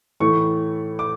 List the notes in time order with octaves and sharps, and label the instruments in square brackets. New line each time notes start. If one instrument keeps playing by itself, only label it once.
[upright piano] A2 E3 A3 C#6
D6